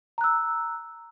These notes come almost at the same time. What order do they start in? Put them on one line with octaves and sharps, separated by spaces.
A#5 F#6 E6